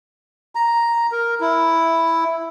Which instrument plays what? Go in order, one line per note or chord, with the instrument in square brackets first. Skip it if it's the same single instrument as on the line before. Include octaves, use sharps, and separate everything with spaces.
[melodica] A#5
A#4
E4